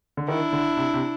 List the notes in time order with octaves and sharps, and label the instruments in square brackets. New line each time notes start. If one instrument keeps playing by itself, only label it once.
[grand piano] D3
[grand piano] D#3 [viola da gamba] D4 E4
[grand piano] D3
C3
C3